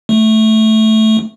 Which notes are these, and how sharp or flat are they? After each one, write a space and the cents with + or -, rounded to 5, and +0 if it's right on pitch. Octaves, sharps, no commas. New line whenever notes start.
A3 -5